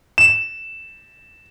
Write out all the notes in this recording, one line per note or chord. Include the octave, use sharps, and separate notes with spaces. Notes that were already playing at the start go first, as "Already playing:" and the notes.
E7